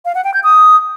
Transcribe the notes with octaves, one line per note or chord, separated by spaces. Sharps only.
F5
F#5
G5
G6
D#6